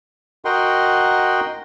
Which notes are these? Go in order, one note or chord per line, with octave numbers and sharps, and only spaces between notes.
F#4 A#4 D#5 F#5 G5 C6